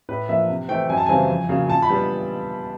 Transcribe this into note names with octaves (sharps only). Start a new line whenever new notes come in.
A2 B4
F3 A#3 D4 E5
C3
E3 A3 C4 G5
F#2 G#5
A5
C#3 E3 G3 C4 G#5
F2
C#3 F#3 A#3
A#2 A5
B5
G3 B3 D4